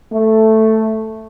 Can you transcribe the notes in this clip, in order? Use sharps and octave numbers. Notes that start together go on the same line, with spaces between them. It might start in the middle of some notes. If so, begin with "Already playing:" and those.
A3